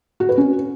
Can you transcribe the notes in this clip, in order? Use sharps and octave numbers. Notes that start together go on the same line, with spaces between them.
F#4
B4
C#4